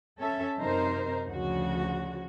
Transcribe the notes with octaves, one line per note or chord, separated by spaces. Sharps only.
C#4 A4 E5
F#2 C3 D#4 A#4 C5
D2 C#3 F3 F#4